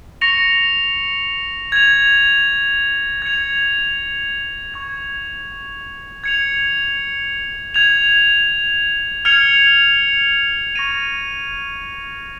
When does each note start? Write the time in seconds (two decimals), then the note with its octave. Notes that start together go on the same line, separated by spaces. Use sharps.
0.21 C#6 A#6 C#7 F7
1.72 G#6 F7
3.22 G#6 C#7 F7
4.74 C#6 G#6 F7
6.24 G#6 C#7 F7
7.74 G#6 F7
9.25 F6 G#6 C#7 F7
10.75 C#6 A#6 D#7